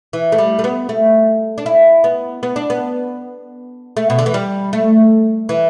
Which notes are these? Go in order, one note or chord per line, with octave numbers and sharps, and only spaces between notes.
E3
A3
G3
A3
B3
A3
D4
E4
B3
B3
D4
B3
A3
B2
D3
E3
G3
A3
E3